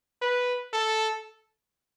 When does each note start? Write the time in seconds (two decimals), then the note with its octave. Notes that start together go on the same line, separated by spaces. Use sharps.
0.22 B4
0.73 A4